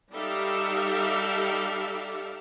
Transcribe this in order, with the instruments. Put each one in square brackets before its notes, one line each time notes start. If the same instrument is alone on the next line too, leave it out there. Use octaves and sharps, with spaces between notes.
[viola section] G3 D#4 G4 A4 E5 F5